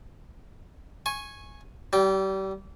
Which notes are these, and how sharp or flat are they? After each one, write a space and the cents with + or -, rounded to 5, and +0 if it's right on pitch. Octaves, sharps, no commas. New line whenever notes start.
G#5 +0 C#6 -15
G3 -30 G5 +0